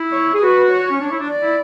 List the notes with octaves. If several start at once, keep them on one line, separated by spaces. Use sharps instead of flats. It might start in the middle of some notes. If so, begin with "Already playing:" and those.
Already playing: E4
C#5
G#4
F#4 B4
C#5
C#4
D4
E4
D4
D5
E4